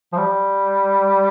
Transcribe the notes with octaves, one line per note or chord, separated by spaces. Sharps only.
F3
G3